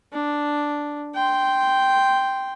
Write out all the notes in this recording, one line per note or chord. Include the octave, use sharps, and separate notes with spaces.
D4
G5 C6